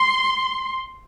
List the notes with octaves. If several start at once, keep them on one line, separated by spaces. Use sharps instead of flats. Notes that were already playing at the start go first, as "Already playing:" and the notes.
Already playing: C6